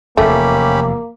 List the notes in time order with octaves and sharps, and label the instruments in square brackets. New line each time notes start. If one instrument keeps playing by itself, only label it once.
[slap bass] F1 E2 [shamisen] A3 [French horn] A#3 [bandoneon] C#4 G4 B5